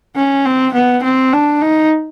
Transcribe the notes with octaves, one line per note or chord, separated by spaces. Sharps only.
C#4
C4
B3
C4
D4
D#4